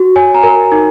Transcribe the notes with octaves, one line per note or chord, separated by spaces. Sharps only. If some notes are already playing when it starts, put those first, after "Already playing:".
Already playing: F#4
C#5 G#5
A#5
A#4
D#4